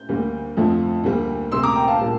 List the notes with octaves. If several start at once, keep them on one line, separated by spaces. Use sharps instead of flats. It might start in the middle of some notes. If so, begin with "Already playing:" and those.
Already playing: G6
D2 D3 G3 A#3
F2 D3 F3 A3
D2 D3 G3 A#3
D2 C3 G3 A#3 C6 E6
A#5 D6
G5 A#5
F5 A5
A#2 G3 A#3